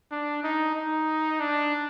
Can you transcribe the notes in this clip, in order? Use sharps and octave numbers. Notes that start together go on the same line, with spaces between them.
D4
D#4
D#4
D4